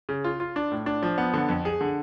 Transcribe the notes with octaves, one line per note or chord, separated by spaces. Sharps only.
C#3
F4
F4
D4
A2
D4
F3
B3
D3
F2
G#4
D3